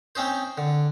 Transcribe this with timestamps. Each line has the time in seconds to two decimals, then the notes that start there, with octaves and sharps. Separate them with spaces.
0.15 C4 C#4 D#4 C5
0.58 D3